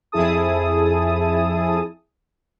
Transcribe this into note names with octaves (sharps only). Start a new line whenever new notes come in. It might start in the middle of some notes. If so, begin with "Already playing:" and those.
F2 E4 G#4 A5 D#6